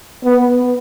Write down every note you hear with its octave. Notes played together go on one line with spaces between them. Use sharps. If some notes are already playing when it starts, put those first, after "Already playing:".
B3